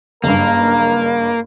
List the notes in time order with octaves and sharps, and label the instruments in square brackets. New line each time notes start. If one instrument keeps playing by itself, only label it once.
[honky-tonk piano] F#1 G2 [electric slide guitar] A#3 [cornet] A#4